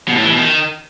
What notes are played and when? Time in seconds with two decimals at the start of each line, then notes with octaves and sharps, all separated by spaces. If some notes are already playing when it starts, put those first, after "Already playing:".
0.08 B2
0.16 A2
0.23 E3
0.31 B2
0.38 D#3